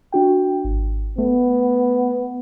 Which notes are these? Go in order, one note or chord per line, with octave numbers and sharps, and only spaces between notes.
D4 F#4 G5
G#1
A3 B3